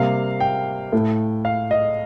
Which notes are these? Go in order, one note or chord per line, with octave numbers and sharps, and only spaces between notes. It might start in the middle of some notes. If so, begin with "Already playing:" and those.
Already playing: C3 G3 A#3 F5
G5
A2 A3
F5
D#5